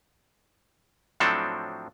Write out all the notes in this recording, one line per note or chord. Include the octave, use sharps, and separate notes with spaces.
A2 F3 F#3 C4 D4 A4